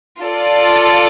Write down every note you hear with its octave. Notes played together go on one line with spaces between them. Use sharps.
F4 A4 D5